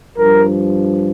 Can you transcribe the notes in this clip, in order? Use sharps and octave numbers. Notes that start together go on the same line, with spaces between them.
G2 F3 A#4